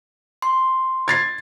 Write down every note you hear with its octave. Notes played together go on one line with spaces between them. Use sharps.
C6
G#6 A6 C7